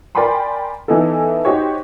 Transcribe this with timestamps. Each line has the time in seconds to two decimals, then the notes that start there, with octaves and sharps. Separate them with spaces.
0.15 A#4 D5 G5 G#5 B5 C6
0.88 E3 B3 D#4 E4 A4
1.45 D#4 F#4 G4 C5 C#5